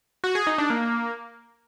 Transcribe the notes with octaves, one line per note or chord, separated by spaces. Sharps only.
F#4
G#4
D#4
D4
A#3